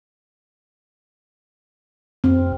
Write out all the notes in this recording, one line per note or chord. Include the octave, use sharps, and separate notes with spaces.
F2 C4